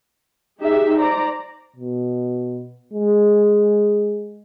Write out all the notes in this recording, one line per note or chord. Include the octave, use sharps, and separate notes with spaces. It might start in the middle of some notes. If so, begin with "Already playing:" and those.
D#4 G4 G#4 E5
C5 D5 A#5
B2
G#3